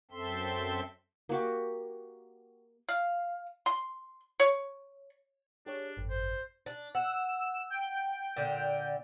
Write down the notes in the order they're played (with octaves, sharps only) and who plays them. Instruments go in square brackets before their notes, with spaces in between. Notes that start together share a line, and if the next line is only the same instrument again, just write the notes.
[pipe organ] F#2 C4 A4 E5 C6
[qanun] A#3 F#4 G4
[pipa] F5
C6
C#5
[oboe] D4 [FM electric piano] G4 G#4 C#5
[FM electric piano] G#1 F#2
[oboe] C5
[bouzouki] D4
[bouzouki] F#5 [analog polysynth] E6
[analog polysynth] G5
[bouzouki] A#2 D3